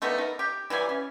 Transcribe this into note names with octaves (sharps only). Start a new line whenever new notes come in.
D#3 A3 B3 D4
D#4 A#4
G4
E3 F#3 G3 G#5
C#4